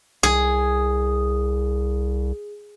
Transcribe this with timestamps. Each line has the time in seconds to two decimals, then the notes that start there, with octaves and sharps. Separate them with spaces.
0.23 C2 G#4